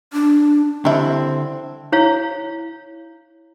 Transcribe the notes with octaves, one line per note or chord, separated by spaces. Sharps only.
D4
D3 G3 C4 E4
E4 C#5 F5